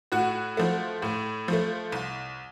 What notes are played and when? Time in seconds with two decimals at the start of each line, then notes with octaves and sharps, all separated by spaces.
0.12 A2 F#4
0.57 F3 A3
1.02 A2
1.48 F3 A3
1.92 C2